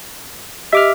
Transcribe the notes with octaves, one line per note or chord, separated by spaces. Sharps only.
G4 D#5 E5 D6 F6